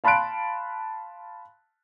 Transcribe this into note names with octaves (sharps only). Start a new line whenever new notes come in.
F5 A5 B5 C6 F#6 D7